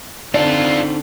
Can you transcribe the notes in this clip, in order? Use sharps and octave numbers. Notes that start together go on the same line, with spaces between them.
D3 C4 D#4 F4 A4 C5 D5 F5